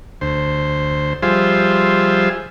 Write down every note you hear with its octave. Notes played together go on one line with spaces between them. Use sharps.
D2 C5
F3 G3 F4 G#4 C5 E5